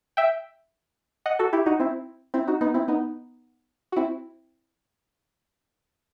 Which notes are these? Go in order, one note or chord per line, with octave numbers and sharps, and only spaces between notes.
E5 G5
D#5 F#5
F#4 A4
E4 G4
D#4 F#4
C4 E4
C4 E4
D#4 F#4
B3 D#4
C4 E4
B3 D#4
F#4
C4 E4